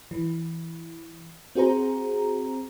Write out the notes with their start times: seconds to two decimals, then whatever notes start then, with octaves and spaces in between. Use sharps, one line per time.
0.11 E3
1.55 C4 F#4 G#4 C5 A#5